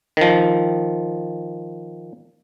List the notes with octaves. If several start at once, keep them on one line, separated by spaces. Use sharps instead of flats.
D#3 F3